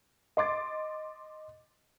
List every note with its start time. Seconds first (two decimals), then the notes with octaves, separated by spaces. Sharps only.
0.37 D#5 C6 D6 A6